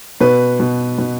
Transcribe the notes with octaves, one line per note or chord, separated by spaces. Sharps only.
B2 B4
B2
B2